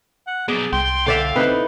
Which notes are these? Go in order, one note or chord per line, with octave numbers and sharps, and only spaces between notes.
F#5
B2 F#3 G#4 D5
C2 G5 C6
D3 D5 E5 F5
C4 D#4 E4 B4